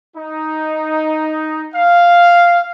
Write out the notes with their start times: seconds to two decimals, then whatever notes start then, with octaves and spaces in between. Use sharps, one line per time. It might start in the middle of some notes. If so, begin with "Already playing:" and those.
0.15 D#4
1.75 F5